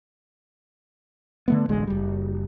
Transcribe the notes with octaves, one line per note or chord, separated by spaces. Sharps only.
D3 A3 B3
D1 A1 D2 G#3
F#1 G3